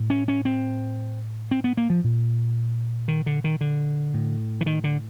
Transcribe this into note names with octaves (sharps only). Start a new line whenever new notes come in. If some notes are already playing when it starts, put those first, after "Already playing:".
Already playing: A2
C#4
C#4
C4
C4
B3
A#3
F3
A#2
D#3
D3
D#3
D3
A2
E3
D#3
D3